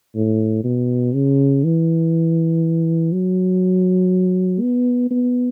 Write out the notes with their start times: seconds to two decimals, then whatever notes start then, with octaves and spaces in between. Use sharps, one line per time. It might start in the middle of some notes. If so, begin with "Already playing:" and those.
0.16 A2
0.64 B2
1.15 C#3
1.64 E3
3.12 F#3
4.61 B3
5.11 B3